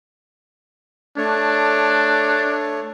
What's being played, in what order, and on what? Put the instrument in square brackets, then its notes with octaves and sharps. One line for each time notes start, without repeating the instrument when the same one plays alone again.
[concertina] A3 C#5 [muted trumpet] D4